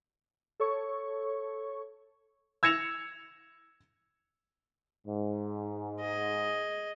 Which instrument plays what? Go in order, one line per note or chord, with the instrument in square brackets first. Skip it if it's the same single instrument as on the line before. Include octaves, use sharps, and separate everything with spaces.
[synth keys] A4 C#5 C#6
[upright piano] E6 G#6 A#6 C#7 E7 F7
[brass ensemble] G#2
[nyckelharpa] G#4 D#5